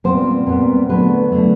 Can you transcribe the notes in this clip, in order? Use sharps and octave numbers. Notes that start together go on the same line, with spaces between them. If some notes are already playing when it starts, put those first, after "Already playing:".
A#2 G3 B3 C4 C5
A#2 G3 B3
D3 F#3 A3 B3 B4
D3 F#3 A3